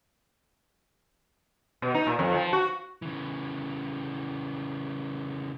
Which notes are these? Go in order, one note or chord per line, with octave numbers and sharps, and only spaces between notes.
B2
D#4
A#2
F2
F3
F#4
C#3 E3